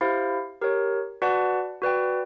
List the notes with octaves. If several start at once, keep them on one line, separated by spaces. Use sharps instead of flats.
E4 G4 C5 F5
G4 A#4 C#5
F#4 B4 D5 F#5 A5
F#4 B4 D5 G5